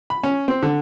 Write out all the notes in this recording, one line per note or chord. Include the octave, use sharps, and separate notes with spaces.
B5
C#4
C4
D3